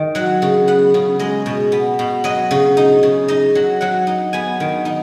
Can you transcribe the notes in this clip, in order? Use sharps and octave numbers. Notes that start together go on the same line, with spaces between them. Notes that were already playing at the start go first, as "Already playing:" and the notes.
Already playing: D#3 D#4
F#3 F#5
C#3
B3 F#5
C#3
G#3 D#5
B2
B3
B2
F#3 D#5
C#3
D#4
C#3
D#4 D#5
F#3
F#3 F#5
D#4
B3 G#5
D#3
D#4